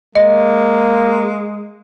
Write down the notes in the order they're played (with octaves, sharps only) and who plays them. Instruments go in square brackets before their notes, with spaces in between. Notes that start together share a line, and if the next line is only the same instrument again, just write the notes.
[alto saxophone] G#3 [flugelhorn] A#3 [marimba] D#5